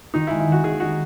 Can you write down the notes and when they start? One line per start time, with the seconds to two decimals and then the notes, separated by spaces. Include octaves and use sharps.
0.14 D#3 D#4
0.27 G#3 E4
0.40 E4
0.48 D#3 F#4
0.64 D#3 G#4
0.80 D#4 F#4